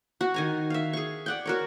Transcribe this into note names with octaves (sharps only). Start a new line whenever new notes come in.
F#4
D#3 G#5 A#5
E5 F5
G#4 C#6
D5 F#5 G5
F#4 A#4 C#5